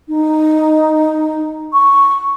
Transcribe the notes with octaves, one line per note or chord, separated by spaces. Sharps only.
D#4
C#6